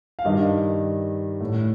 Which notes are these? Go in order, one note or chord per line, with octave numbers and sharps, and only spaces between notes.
F5
G2 D#3 D#5
A2